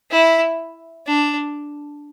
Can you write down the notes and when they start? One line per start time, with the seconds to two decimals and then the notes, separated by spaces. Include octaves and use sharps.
0.11 E4
1.07 D4